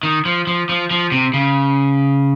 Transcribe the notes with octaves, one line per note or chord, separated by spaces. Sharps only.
D#3
F3
F3
F3
F3
C3
C#3